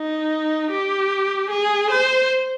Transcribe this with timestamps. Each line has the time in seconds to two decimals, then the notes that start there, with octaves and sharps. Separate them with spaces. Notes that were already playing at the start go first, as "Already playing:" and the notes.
Already playing: D#4
0.71 G4
1.50 G#4
1.90 C5